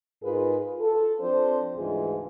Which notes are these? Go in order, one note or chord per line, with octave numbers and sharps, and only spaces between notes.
G#2 F4 G#4 A#4 B4
F4 A4
F3 C4 D4 A4 C5
D2 G#2 E3 F4 G#4